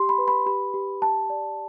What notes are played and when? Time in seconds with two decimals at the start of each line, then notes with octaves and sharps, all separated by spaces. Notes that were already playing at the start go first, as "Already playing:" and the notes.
Already playing: G4 C6
0.09 B5
0.18 B4
0.28 B5
0.46 G4 B5
0.74 G4
1.02 G4 A5
1.30 D5